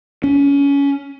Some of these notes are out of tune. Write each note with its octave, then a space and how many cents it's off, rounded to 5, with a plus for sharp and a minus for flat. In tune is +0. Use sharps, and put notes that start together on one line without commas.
C#4 +25